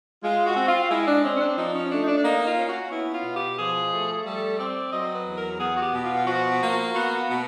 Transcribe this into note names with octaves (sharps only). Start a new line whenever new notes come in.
G#3 F4
F#4
C4
F4
G#3 E4
D4
C4 C#4
C#4
D4
F3 D#4
C#4
A3 D4
D#4
D4
D4
A#3 D#4
F4
C#4
F#4
B3 E4
F4
B2
G4
F3 G#4
A3
G3 A4
C4 D5
F#3 D#5
B4
E2
A#4
B3 G#4
F#4
G4
B2
F4
F4
F3 F#4
A#3
B3 F#4
F#4
B2